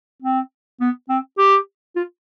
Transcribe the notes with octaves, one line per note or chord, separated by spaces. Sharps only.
C4
B3
C4
G4
F4